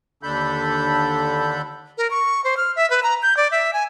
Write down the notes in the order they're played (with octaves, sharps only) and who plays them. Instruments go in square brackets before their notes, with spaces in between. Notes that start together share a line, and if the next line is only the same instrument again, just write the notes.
[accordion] D#2 D3 D4 A4 B5 G6
[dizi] A#4
C#6
C5
F6
E5
B4
A#5
G6
D5
E5
G#5